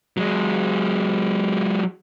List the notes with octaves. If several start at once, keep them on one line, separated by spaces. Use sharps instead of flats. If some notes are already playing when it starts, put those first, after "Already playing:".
F#3 G#3